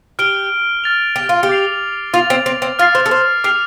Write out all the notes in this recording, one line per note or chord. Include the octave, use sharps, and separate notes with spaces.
G4 F6 D7 G7
F6 A6 F7
G4
F4
G4
D6 A6 C7 F7
F4 A6 F7
C4
C4
C4
F4 F6 A6 C7
C5
A4
C5
G4 D6 F6 C7 F7